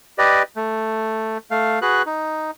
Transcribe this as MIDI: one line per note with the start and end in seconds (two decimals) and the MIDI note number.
0.18 0.43 67
0.18 0.43 71
0.18 0.43 74
0.18 0.43 75
0.56 1.38 57
1.51 1.79 57
1.51 1.79 77
1.82 2.02 66
1.82 2.02 68
1.82 2.02 71
1.82 2.02 90
2.06 2.51 63